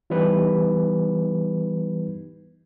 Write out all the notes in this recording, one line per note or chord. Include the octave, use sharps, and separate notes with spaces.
E3 G3 B3 D#4 B4